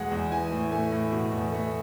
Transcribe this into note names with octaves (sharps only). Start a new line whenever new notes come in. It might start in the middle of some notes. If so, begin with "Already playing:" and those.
Already playing: E2 B2 G#3 F#5
E2
E3 G#5
A2
A3 G#5
A2
B2
E2
A3